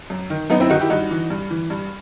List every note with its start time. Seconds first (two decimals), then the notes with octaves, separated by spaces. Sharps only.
0.10 F#2
0.30 D#3
0.50 F#2 B3 D#4
0.60 C4 E4
0.70 D#3 D#4 F#4
0.80 E4 G4
0.90 G2 D#4 F#4
1.11 E3
1.30 G2
1.51 E3
1.70 G2